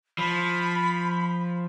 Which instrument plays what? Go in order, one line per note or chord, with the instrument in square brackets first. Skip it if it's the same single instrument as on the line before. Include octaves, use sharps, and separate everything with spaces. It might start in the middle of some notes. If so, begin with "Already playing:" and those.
[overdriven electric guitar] F3 [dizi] B5